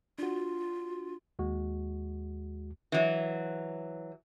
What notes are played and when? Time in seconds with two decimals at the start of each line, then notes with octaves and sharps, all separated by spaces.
0.18 D4 F4 F#4
1.39 D#2 G#3 F#4
2.92 E3 F#3